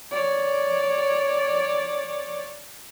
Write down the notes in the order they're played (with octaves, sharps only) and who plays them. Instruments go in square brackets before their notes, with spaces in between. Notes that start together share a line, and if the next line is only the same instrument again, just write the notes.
[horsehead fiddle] C#5 D5